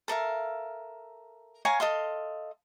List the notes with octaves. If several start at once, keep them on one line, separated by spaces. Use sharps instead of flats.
A4 A#4 E5 F5
C#5 F5 G#5 A#5
A4 D#5 F5 C6